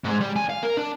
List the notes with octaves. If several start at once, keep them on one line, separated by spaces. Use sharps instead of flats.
G#2 G#3
G3
D#2 G#5
F5
A#4
D4